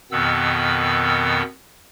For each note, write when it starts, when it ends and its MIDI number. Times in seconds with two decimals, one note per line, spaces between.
0.12 1.42 41
0.12 1.42 47
0.12 1.42 51
0.12 1.42 59
0.12 1.42 88